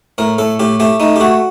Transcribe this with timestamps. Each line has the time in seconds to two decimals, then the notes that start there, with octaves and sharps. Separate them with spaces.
0.18 A2 A#4
0.38 A2 A4
0.59 A2 G4
0.80 A3 G4
1.00 A3 D#4
1.16 G4
1.20 A3 F#4